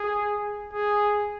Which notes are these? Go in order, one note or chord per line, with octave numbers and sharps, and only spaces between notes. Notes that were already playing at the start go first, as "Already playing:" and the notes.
Already playing: G#4
G#4